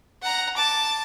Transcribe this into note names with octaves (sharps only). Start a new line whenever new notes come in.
F#5 A#5
A5 D6